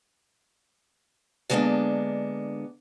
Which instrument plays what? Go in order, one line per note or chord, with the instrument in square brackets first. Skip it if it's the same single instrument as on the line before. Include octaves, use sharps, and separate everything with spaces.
[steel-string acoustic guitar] D3 G3 G#3 A#3 B3 D4